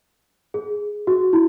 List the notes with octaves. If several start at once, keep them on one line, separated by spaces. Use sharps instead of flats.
G#4
F#4
E4